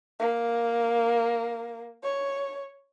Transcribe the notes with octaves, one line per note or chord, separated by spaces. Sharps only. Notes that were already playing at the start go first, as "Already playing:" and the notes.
A#3
C#5